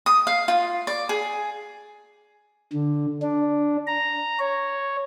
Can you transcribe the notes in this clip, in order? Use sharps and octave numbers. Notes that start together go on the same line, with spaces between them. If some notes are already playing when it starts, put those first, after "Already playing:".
D#6
F5
F4
D5
G#4
D3
D4
A#5
C#5